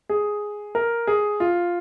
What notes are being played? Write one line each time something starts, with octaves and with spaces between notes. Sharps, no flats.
G#4
A#4
G#4
F4